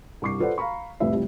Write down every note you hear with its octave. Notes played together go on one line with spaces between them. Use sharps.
C2 G2 C#6 D6 C7
F4 A4 B4 C5 D5 F#5
F5 A#5 B5 C#6
C2 F2 A2 B4 E5
A2 C3 F3 G3